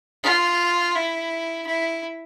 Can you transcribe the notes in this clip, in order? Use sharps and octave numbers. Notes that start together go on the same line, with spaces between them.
F4
E4
E4